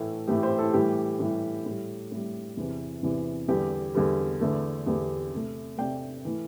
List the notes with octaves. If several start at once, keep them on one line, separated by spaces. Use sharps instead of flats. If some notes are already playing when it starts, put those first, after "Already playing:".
Already playing: A2 E3 A3 E4
A2 E3 A3 G4
G4 C5
E4 A4
A2 E3 G3 G4
A2 E3 G3
A2 G3 E4
A2 G3
E2 C3 E3 E4
E2 C3 E3
E2 D3 G3 G4
E2 D3 G3
E2 D3 A3
E2 D3 A3 G4
C3 A3
C3 A3 D5 G5
E3 A3